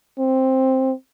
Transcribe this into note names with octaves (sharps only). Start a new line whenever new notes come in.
C4